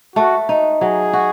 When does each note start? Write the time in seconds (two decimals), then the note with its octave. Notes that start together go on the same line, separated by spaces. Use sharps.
0.16 A3 F#4
0.49 D#4
0.81 F#3 G#4
1.13 F#4